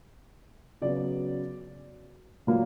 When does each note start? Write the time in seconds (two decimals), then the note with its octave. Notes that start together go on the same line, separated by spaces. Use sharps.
0.82 C#3 F#3 B3 D5
2.47 A#2 F#3 A#3